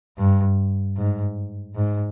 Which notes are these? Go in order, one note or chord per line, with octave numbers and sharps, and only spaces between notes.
G2
G#2
G#2